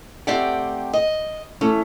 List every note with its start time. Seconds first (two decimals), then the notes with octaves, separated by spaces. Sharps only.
0.27 A3 C4 G4 D5 F#5 G5
0.93 D#5
1.61 E3 A3 C#4